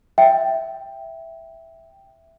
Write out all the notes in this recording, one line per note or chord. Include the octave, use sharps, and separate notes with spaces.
E5 G5